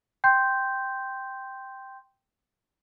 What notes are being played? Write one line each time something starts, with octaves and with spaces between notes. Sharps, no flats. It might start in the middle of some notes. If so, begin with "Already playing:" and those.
G5 C6 G6